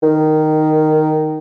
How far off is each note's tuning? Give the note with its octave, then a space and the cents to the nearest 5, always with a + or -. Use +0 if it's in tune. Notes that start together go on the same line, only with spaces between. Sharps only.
D#3 -5